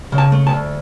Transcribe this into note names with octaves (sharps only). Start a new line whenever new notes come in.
C#3
A5
A3
A5
D2